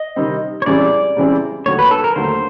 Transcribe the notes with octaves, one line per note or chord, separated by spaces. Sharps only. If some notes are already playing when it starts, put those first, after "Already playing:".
Already playing: D#5
C3 D#3 G3 C4
C#5
C#2 C#3 E3 G3 C4 D5
C#2 C#3 E3 G3 C4
D#2 D3 F#3 A3 C#5
B4
A4
A#4
D#2 D3 F#3 A3 C5